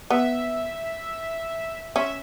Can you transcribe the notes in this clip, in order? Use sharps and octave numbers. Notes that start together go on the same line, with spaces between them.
B3 E5
C#4 E5